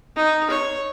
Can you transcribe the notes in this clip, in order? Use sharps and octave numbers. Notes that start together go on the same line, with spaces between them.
D#4
C#5